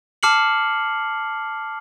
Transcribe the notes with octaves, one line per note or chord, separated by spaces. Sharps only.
A5 D6 F6 C7 C#7 F#7